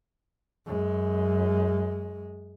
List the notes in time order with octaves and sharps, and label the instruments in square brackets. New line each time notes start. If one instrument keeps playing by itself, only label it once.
[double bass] F#2 G#3